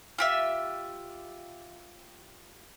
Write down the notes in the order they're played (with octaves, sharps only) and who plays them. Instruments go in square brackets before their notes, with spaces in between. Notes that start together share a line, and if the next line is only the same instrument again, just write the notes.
[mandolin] F4 G4 E5